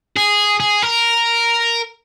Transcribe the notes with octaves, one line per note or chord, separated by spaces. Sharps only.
G#4
G#4
A#4